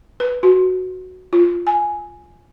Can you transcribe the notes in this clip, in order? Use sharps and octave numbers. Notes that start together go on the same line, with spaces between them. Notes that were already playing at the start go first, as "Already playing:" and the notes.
B4
F#4
F4
G#5